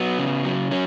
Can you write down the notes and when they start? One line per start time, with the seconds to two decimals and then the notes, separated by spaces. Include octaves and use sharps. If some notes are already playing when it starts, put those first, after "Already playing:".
Already playing: F#3 B3
0.19 C#3
0.45 F#3
0.71 F#3 C#4